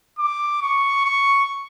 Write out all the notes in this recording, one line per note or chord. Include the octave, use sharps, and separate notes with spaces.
D6
C#6
C#6